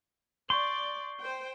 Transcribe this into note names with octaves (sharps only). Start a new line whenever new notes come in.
D5 C6 C#6 G6
C5 G5